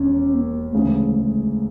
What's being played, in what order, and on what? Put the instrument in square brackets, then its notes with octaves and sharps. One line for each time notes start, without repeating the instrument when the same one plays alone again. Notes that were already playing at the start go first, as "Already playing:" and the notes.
Already playing: [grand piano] E1 D#2 D#3 [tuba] C#4
[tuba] A#3
[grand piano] D2 C#3 E3 [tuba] G#3
[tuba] G#3